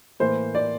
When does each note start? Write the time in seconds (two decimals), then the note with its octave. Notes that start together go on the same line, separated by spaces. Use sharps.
0.20 A2 E3 A#3 C5
0.55 D5